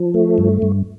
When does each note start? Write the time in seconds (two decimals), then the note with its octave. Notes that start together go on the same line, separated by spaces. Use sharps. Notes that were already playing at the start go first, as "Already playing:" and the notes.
Already playing: F3
0.14 A3
0.38 G2
0.62 G2